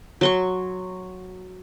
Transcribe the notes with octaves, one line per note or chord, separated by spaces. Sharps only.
F#3 C6 C#6